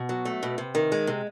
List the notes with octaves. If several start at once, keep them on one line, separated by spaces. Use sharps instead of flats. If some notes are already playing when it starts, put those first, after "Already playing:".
Already playing: B2
F#3
A3
B2
C3
D#3
G#3
C3